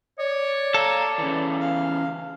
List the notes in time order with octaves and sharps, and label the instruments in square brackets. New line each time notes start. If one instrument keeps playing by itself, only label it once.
[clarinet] C#5 [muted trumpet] D5
[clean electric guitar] A4 [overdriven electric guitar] F5 A#5
[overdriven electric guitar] C#3 E3
[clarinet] F5